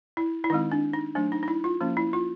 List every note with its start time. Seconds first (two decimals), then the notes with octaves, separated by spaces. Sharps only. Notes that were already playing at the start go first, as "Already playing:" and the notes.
0.17 E4
0.44 E4
0.50 D#3 G#3 C4 D#4
0.72 D4
0.94 D#4
1.15 F#3 A3 D4
1.32 D#4
1.43 D#4
1.48 E4
1.64 F4
1.81 F3 A#3 C#4
1.97 E4
2.13 F4